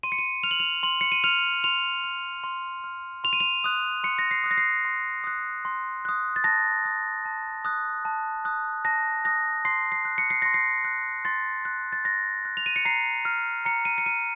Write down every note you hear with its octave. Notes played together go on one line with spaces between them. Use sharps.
C6 D#7
C#7
D#7
F6 F7
F#7
F7
C6 F#7
C#7
D#7
F6 F7
C6 F7
F6
C6
F6
C6 F7
D#7
F7
D#6 F#6
C6 C#7
A#6
C7
D#6 F#6
A#6
C7
C6
D#6 F#6
C6
D#6 F#6
A6
A5 A#6
D#6 F#6
A5
D#6 F#6
A5
D#6 F#6
A5 A#6
D#6 F#6 A#6
C6 C7
C7
F#6
C#7
C7
C6 A#6
C7
F#6
C6 A6
F#6
A6
C6 A#6
F#6
F7
D#7
C#7
A#5 C7
F6
A#5 C#7
D#7
C#7
F6 D#7